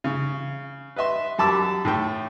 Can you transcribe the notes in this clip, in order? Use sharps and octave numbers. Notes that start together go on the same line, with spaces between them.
C#3
B4 D#5 E5 C6
F#2 G4 A5 B5 D6 E6
A2 A3 G5